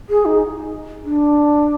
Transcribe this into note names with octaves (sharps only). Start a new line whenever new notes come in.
G#4
D#4
D4